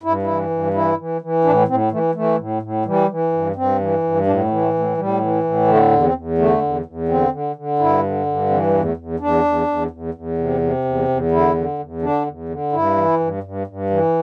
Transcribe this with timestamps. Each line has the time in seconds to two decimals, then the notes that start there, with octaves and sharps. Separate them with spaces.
0.03 G2 E4
0.23 E3 E4
0.50 G2
0.74 E3 E4
0.97 E3
1.21 E3
1.45 A2 D4
1.68 A2 C4
1.92 E3 A3
2.15 E3 A3
2.38 A2
2.62 A2
2.85 E3 G3
3.09 E3
3.33 G2
3.56 G2 C4
3.80 E3
4.03 G2
4.26 A2 D4
4.44 A3
4.50 E3
4.61 A3
4.74 A2
4.79 A3
4.97 A2 G3
5.21 E3
5.44 A2
5.67 D3 A3
5.91 E2
6.03 C4
6.14 E2
6.38 D3 A3
6.62 E2
6.86 E2
7.09 D3 C4
7.32 D3
7.56 D3
7.79 G2 E4
8.03 D3
8.26 G2
8.50 E3 C4
8.67 G3
8.73 E2
8.85 A3
8.97 E2
9.20 E2 D4
9.44 E2
9.67 E2
9.91 E2
10.14 E2
10.38 C3
10.61 C3
10.85 E2
11.08 E2
11.31 D3 E4
11.55 D3
11.79 E2
12.02 D3 D4
12.26 E2
12.49 D3
12.72 G2 E4
12.96 E3
13.20 G2
13.43 G2
13.67 G2
13.90 E3